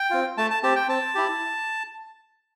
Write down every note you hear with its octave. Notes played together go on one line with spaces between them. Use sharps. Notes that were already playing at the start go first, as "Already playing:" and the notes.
Already playing: G5
C4 F4
A3 A5
A5
C4 G4 A5
G5
C4 A5
E4 G4